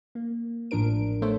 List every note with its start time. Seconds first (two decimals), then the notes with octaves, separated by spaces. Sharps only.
0.15 A#3
0.71 A1 A2 F3 D4 A#4 D7
1.22 A3 B3 A4 C5 C#5 E5